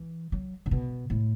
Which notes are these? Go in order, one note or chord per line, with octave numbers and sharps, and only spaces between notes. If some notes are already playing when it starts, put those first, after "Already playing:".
Already playing: E3
F#3
C#3
B2
A2